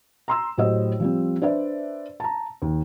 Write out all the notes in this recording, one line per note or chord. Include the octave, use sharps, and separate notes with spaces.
A#5 C6 E6
A2 F#3 G4 C5 D#5 E6
F3 G3 C4
D4 B4 C5 D5 E5
A5 A#5
D#2